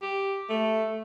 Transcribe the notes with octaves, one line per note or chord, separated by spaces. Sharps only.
G4
A3